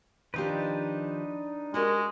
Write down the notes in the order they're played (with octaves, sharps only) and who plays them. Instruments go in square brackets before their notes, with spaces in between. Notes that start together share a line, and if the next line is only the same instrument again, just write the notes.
[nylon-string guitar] D#3 F3 G4 [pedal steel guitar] D4 D#4 B4
[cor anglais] G#3 [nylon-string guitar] F#4 G4 A#4